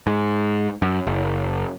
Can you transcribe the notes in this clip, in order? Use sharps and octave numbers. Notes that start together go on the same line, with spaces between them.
G#2
F#2
F#1